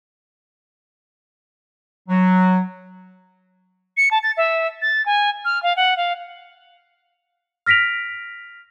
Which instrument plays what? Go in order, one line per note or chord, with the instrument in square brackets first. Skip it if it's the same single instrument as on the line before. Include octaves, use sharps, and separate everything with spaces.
[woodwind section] F#3
[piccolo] C#7
A5
A6
E5
A6
G#5
F6
F5
F#5
F5
[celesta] F6 A#6 B6 D7 F7